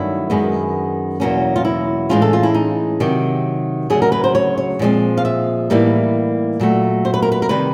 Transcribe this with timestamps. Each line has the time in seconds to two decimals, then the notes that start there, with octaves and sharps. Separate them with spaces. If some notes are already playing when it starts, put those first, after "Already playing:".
Already playing: G2 D#3 F#3 A3 C#4 E4
0.30 F#2 D#3 G#3 B3
1.20 E2 B2 F#3 A#3 C#4
1.56 F4
1.65 E4
2.09 A2 E3 G#3 C#4 F4
2.22 A4
2.33 F4
2.43 E4
2.54 D#4
3.00 C3 D#3 F#3 G4
3.90 D2 C#3 F#3 G#4
4.02 A#4
4.12 B4
4.24 C5
4.35 C#5
4.58 C#5
4.79 A#2 F3 G#3 C4
5.18 F5
5.25 E5
5.70 A2 E3 G3 A#3 D#4
6.60 A#2 F#3 A3
7.05 C5
7.14 B4
7.22 A#4
7.32 B4
7.42 A#4
7.49 C3 D#3 G3 B4